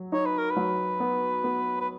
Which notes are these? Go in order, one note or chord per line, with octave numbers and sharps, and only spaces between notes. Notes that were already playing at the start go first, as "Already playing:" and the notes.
Already playing: F#3
D#4 C#5
B4
A#4
B4
F#3
B3
B3
B4